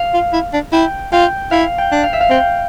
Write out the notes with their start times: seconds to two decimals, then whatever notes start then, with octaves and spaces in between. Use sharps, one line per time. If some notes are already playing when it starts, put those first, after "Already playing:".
Already playing: F5
0.14 F4
0.33 E4
0.53 D4
0.72 E4 G5
1.13 F4 G5
1.51 E4 F5
1.78 G5
1.92 D4
2.04 F5
2.13 E5
2.21 F5
2.30 C4 G5